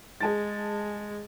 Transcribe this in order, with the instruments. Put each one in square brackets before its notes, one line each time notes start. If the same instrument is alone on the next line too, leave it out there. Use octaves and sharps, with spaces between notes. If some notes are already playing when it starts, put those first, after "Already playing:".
[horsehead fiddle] G#3 [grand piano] G#4 A5 A6